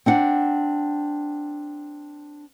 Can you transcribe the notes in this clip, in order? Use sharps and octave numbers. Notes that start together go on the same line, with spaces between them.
C4 D4 F#5